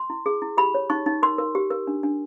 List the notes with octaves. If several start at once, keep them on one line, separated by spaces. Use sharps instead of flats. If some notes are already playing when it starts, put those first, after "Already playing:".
Already playing: C6
E4
G#4
E4
G4 B5
C#5
D#4 C#6
D#4
A#4 C6
A#4
G4
A#4
D4
D4